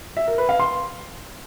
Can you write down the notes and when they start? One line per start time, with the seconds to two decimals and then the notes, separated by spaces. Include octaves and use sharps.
0.17 E5
0.27 A#4
0.38 B4
0.49 F5
0.60 C6